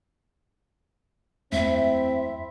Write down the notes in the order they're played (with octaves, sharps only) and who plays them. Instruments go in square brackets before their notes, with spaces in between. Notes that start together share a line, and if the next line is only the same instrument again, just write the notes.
[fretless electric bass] F#1 E2 A3 [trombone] C4 [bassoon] E4 [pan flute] E5